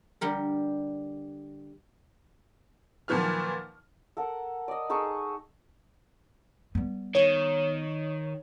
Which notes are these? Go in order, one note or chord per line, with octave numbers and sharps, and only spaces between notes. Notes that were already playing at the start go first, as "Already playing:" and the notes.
D3 G3 A#4
A#2 D#3 F3 F#3 B4 F6
A4 A#4 F#5
D5 D#5
D#4 G#4 A4 C#6
G3 B3
D#3 C#5